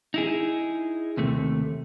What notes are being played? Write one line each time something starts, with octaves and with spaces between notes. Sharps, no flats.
D#4 E4 G#4
D#2 C3 A3